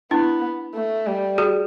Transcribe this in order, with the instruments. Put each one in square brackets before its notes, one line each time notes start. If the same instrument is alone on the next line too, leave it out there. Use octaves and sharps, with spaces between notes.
[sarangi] B3 [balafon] D4 E4
[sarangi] A3
G3
[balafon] F#4 G#4